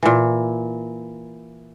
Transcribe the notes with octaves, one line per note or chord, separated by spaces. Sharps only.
A#2 E3